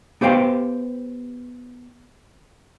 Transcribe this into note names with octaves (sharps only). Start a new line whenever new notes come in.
B3 G4 C5 F5 G5